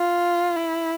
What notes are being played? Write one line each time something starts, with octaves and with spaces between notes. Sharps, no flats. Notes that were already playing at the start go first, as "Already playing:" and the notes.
Already playing: F4
E4